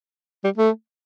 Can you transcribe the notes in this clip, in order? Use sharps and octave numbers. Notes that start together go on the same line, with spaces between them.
G3
A3